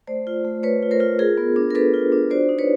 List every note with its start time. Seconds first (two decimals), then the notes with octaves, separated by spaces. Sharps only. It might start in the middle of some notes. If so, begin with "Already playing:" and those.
0.07 A3 C5 D5
0.27 F4
0.45 A3
0.63 A3 B4 C#5
0.83 F4
0.91 A#4 C5
1.00 F4
1.19 F4 G#4 A#4
1.37 B3
1.56 D4
1.71 A#4
1.75 D4 A4 B4
1.94 F4
2.12 D4
2.31 F#4 C5 D5
2.49 D#4
2.58 B4 C#5